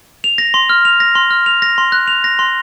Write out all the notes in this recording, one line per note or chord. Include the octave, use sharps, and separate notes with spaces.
F7
A#6
C6
F6
F7
A#6
C6
F6
F7
A#6
C6
F#6
F7
A#6
C6